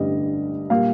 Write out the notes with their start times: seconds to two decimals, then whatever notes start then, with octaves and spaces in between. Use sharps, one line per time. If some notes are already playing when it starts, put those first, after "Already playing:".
Already playing: A1 G2 D3 G3 D#5
0.70 A#2 G3 F5